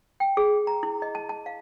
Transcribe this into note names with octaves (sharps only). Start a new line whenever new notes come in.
G5
G#4
A#5
E4
D#5
A5
A5
F5